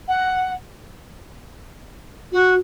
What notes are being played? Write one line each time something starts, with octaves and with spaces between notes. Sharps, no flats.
F#5
F#4